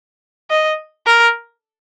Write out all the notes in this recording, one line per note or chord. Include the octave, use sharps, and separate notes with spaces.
D#5
A#4